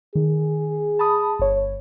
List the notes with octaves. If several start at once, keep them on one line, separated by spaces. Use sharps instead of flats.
D#3 G#4
A5 B5 D#6
G1 C#5